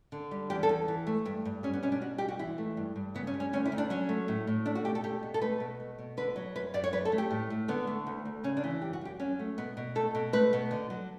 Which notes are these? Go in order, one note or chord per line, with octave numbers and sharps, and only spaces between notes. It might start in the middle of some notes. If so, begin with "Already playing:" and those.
D3
G3
E2 G4
A4
E2
E3
A3
G2
G2
G3 C#4
B3
B2 C#4
D4
G3 F#4
B2 G4
F#4
E3 E4
A3
G2
G2
C#3 B3
C#4
G3
C#4
D2 C#4
E4
D2
D4
F#3 C#4
A3
A2
A2
A3 D4
F#4
B2 G4
A4
A3 G4
B2
A4
A3 B4
B2
A3
B2
D3 B4
F#3
F#2 B4
F#2 D5
C#5
F#3 B4
A4
A3
G4
A2
A2
D3 B3
A3
D2
D2
C#3 C#4
D4
E3
F#2 G4
F#4
F#2 G4
F#3 C#4
A3
B2 B3
B2
A3 A4
B2
A3 B4
B2
D3
F#3